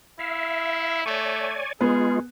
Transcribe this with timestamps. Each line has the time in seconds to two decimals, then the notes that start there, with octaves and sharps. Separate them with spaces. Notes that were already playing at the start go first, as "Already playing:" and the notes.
0.19 E4 E5 F5
1.06 A3 C#5 D5 G#5
1.81 G#3 B3 F4 G#4